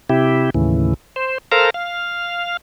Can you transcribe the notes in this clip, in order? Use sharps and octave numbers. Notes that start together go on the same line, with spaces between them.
C3 E4 G4
D#2 A2 C#3 E3
C5
A4 A#4 C5 F5 A#5
F5